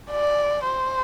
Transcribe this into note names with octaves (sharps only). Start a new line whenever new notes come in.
D5
C5